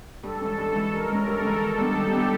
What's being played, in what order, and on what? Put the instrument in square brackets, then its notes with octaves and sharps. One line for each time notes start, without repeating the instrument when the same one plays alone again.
[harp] G2 [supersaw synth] A4
[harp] E3 G#3 C#4
G2
E3 G#3 C#4
[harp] G2 [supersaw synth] A#4
[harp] E3 G#3 C#4
[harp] G2 [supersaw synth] A4
[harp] E3 G#3 C#4
[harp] D#3 [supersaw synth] A4
[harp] G3 B3 D4
[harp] D#3 [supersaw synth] G4
[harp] G3 B3 D4